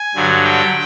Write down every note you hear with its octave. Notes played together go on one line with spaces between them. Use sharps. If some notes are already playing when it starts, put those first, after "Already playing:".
Already playing: G#5
G2 D3 F#3
G5